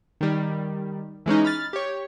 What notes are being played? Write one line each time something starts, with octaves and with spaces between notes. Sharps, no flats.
D#3 G3
E3 G#3 C#4 D#4
B5 F6 A6
G4 C#5